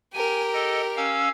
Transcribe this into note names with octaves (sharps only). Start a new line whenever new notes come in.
G4 A#4 G#5
A4 D#5
C#4 F5 E6